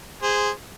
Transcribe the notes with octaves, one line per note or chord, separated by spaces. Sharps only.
G#4 C5